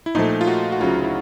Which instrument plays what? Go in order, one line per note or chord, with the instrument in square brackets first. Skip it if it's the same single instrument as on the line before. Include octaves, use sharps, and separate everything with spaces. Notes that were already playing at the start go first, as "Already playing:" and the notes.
[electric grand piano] E4
[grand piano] A#2 F3 A3 [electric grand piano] D#4
[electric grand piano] F4
F#4
F#4
[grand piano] D2 C#3 F#3 [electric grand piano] F4
[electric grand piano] E4